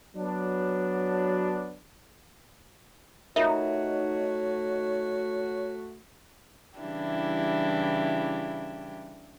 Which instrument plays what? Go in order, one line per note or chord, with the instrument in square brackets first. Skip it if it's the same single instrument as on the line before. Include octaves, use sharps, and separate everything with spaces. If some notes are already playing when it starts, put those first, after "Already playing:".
[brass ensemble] F#3 B3 D4
[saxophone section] A3 F#4 [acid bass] D#4 [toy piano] F4 A#4 E5 [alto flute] C#5
[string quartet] C#3 E3 G3 D4 E4 G4